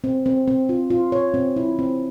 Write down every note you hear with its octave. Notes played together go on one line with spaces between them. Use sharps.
C4
C4
C4
F4
F4
C#5
C4
E4
C4